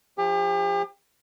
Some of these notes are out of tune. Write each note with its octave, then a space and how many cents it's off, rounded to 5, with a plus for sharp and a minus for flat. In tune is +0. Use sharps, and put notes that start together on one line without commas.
F3 +0 G4 +40